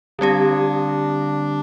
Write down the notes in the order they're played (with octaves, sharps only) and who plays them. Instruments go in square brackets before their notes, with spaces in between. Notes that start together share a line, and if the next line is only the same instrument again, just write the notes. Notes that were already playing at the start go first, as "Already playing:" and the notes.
[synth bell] D3 G3 C4 G4 [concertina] D4